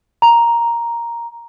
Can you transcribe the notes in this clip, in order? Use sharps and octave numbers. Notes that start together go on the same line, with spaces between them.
A#5